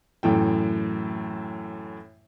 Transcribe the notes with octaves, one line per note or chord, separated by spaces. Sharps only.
F#2 A2 E3 G5